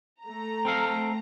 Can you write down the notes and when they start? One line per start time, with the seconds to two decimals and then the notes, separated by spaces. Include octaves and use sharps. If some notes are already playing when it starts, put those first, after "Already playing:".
0.23 A3 A#5
0.65 C4 A4 F5